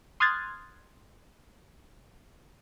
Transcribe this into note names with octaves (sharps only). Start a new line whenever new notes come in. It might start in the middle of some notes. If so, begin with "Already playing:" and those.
C6 D#6 F6 F#6 G#6 A6